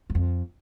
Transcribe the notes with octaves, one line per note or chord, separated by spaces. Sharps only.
F#2
F2